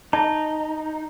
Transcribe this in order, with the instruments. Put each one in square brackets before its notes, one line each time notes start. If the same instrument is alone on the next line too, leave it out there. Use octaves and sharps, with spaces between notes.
[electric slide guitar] D#4 [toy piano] A5